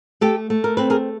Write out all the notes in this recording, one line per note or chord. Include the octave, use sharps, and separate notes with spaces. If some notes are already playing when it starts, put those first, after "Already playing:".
A3 G4 A4
A3
A#4
C4 B4
G#4 A#4